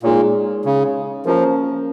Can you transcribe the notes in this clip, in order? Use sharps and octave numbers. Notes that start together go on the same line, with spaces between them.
A#2 G#3 D#4 G#4 C#5
C#3
F3 A#3 C#4 A#4